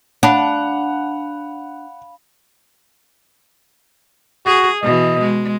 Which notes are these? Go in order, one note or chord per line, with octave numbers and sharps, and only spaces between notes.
D4 F5 F#5 B5 F7
F#4 G#4
B2 E3 D#5
G#3